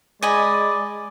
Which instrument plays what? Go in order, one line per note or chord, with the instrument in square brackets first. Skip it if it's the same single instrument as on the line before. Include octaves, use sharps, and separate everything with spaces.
[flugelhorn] G#3 [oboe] D5 [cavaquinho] D#5 G#5 B5